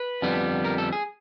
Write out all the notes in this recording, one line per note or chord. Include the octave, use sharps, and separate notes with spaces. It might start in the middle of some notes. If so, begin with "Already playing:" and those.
Already playing: B4
F2 D3 G3 B3
A#4
A4
G#4